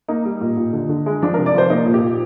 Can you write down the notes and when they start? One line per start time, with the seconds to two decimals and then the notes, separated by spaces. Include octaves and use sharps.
0.08 A#3 D#4
0.25 G3
0.41 A#2
0.57 A#2
0.73 D3
0.89 D3
1.06 G#3
1.23 F3 D4
1.34 C3 A#4
1.46 D5
1.54 F3 C5
1.70 A#3 D#4
1.86 A#2
1.94 G4
2.02 A#2